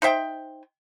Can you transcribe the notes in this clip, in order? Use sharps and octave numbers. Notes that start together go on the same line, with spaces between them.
D#4 C5 E5 G5